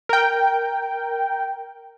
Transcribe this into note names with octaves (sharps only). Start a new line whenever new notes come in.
A#4 G5